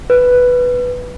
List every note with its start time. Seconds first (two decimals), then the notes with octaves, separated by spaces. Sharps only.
0.10 B4